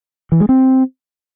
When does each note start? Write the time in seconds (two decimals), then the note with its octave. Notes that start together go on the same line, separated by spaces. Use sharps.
0.32 E3
0.40 G#3
0.49 C4